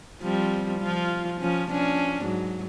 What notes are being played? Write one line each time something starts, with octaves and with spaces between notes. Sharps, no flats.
F3 G3 C4
F3 F4
F3 C#4
F3 C#4 D4
G#2 F#3